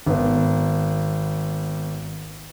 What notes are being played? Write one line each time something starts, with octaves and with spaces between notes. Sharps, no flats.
G#1 B3